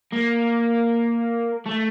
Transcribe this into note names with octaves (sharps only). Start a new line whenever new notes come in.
A#3
A3